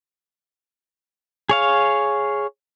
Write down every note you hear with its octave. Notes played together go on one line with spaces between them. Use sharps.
G#4 C#5 F5